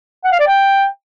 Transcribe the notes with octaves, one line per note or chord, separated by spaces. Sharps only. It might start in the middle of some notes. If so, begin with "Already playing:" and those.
F#5
F5
D5
G5